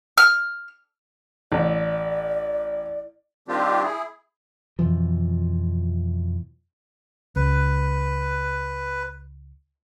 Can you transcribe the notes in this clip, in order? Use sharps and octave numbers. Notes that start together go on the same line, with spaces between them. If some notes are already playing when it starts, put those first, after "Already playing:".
F6
A1 D5
D#3 G3 C4 D4 F4 G4
E4 G#4
F2 B2 E3 F3
C#2 B4